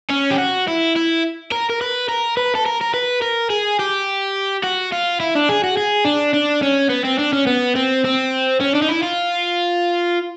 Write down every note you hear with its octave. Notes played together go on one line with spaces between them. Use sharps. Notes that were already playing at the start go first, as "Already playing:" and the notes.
C#4
G4
F#4
E4
E4
A#4
A#4
B4
A#4
B4
A4
A#4
A#4
B4
A#4
G#4
G4
F#4
F4
E4
D4
G#4
F#4
G#4
D4
D4
C#4
B3
C4
D4
C#4
B3
C4
C4
C#4
D4
D#4
E4
F4